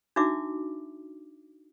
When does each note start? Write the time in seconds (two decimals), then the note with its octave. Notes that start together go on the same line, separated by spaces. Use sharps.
0.16 D4 D#4 F#4 E5 D6